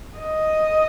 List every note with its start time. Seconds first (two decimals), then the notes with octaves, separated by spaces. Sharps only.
0.19 D#5